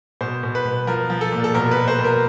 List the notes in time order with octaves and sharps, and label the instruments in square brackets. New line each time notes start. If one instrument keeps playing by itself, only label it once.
[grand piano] B2 C5
B2
B4
B2
F3 A#4
F3
A4
A#2
A4
B2 A#4
B4
B2
C5
B2
A#4